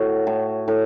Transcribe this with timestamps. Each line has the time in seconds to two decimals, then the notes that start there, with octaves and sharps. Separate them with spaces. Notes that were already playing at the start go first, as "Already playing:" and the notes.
Already playing: A2 F#4
0.27 A2
0.68 A2